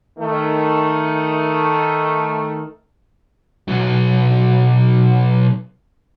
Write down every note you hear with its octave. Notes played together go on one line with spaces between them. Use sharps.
D#3 A3
B1 F#3